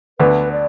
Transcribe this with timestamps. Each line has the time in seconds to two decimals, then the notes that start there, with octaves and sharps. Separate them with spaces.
0.19 D2 D3 B3 B4
0.52 D5